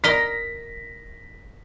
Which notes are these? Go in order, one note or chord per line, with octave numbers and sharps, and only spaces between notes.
A#4 D#5 F5 A#6 B6